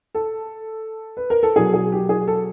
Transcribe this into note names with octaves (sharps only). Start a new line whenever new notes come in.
A4
B4
A#4
A4
B2 F#3 G#4
G#4
G4
G#4
A4